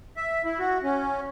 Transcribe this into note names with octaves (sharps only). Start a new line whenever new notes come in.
E5
E4
F#4
C#4